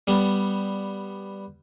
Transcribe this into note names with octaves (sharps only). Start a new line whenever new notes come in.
G3 B3